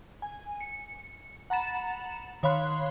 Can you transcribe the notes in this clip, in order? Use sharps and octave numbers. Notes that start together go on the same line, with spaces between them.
G#5
C#7
F#5 A#5 B5 A6 E7
D#3 C#5 F5 B5 C6 F#6